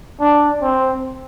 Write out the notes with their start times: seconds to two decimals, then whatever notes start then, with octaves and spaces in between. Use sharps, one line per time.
0.20 D4
0.62 C4